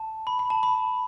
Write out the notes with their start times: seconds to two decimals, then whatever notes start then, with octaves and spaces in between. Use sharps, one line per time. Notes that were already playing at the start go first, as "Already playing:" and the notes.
Already playing: A5
0.27 B5
0.39 B5
0.50 A5
0.63 B5